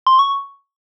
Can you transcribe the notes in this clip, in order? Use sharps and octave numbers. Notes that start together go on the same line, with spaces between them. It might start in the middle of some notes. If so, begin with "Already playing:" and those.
C6
C#6